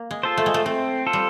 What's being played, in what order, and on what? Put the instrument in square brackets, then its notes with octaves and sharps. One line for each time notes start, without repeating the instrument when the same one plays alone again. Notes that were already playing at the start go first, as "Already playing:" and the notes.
Already playing: [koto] A#3
G#3
[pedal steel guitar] F4 A4 C5
[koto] A3
G#3
A3
[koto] A3 [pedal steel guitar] C4
[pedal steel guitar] F4 A4 C5
[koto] G3